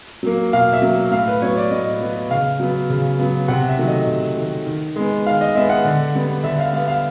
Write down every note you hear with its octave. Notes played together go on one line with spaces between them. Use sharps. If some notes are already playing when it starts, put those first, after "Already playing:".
F#3 A#3
B2 F5
E5
F#3 A#3
A2 F5
B4
F#3 B3 C#5
D5
A2 D#5
F#3 B3
C#3 F5
F#3 B3
C#3
F#3 B3
C3 F#5
E5
D#3 F#3 A3
D#5
C3
D#3 F#3 A3
D#3
G#3 B3
D#3 F5
D#5
G#3 B3 E5
F#5
D3
G3 B3
D3 E5
F5
G3 B3 F5
F5